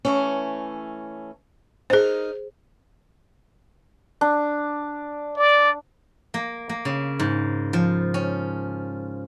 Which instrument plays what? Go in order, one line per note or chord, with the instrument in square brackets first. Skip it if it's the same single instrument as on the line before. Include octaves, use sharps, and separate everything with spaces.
[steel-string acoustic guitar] E3 A3 C#4
[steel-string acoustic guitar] D#4 A#4 [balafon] G#4 C5
[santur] D4
[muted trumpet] D5
[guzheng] A#3
A#3
C#3
G#2
F3
C#4